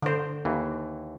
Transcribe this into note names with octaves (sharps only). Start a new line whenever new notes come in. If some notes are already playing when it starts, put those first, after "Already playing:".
D3 C5
D#2 E3